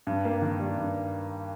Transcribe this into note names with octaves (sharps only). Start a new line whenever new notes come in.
G2
A#3
D#3
G3
G2